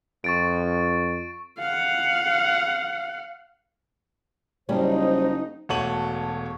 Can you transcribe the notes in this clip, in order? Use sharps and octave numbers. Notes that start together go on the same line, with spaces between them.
F2 C#6 A6 D7
F5 F#5
F#1 G3 C#4 D#4 C5
E1 A3 F#4 C#5 D#7 F#7